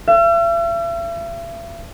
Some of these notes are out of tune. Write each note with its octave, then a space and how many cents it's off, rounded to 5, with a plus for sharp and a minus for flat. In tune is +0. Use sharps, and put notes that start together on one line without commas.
E5 +45